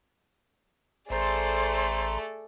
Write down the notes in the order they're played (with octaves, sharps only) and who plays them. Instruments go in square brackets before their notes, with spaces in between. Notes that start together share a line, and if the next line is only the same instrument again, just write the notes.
[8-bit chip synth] A1 A#5 C6 [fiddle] A3 A4 [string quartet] G#4 D5 [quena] C5